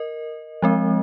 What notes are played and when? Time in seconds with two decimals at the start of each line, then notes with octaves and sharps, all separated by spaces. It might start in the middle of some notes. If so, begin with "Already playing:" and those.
Already playing: A#4 D#5
0.62 F3 G#3 C4